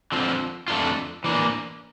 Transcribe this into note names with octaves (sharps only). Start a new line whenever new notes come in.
D3 F3 C4 F4
F2 D3 A3 D4 F4
E3 A#3 D4